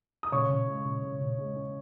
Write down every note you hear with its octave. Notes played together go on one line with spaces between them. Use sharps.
D#6
C#3 C#5 C#6
C#3
G#3
C#3
C#3
C#3
G#3
C#4